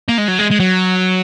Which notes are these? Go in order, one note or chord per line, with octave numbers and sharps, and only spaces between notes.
A#3
G#3
F#3
G#3
G#3
F#3